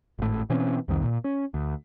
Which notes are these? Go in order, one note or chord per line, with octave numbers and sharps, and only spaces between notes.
G#1 A2
B2 E3 C4 C#4
C2 F2 D#3
A#2
C#4
D2